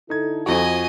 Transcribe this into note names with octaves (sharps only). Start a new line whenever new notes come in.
D3 D#4 E4 A4 G#6
F2 F3 F#4 D#5 G#5 C#6